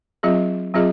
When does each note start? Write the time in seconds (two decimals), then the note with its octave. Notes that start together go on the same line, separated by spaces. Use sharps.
0.23 F#3 C4 F4 G#4 D#5
0.74 F#3 C4 F4 G#4 D#5